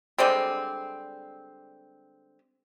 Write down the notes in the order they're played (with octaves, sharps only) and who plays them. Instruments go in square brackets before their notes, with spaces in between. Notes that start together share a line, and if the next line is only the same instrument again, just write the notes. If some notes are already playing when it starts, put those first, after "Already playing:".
[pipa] D3 G3 G#3 C4